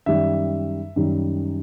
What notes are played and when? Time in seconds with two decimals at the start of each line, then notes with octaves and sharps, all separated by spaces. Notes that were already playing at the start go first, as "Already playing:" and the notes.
0.06 F#2 D#3 G3 E5
0.96 F#2 D#3 G3